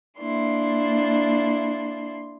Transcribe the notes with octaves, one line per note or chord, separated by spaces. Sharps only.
A#3 D4 E4 C6